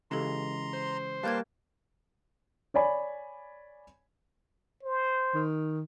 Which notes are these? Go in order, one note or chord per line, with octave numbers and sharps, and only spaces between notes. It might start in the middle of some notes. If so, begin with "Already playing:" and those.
C#3 E3 G#3 G4 A4 A#5 C6
C5
G3 A#3 B4 F5 G5 A5 G6 G#6
C#5 D5 G#5 B5
C5
D#3